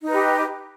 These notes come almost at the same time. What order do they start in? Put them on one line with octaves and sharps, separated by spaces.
D#4 D#5 B4 G4